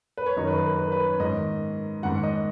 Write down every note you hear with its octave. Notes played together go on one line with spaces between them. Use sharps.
B4
C#5
F#2 D#3 D#5
B4
B4
B4
B4
C#5
G#2 D#3 D#5
G#2 D#3 F#5
D#5